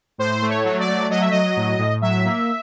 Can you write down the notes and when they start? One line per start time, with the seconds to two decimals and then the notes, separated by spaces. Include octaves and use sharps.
0.18 A2 C5
0.42 A3
0.49 C#5
0.64 F#3
0.80 D5
0.88 A3
1.10 F#3 D#5
1.21 E5
1.31 F#3 D#5
1.56 A2
1.78 A2
2.02 F#3 E5
2.24 A#3